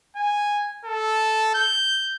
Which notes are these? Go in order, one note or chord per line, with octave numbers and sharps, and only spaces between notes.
G#5
A4
G6